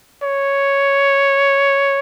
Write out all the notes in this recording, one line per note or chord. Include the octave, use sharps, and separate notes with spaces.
C#5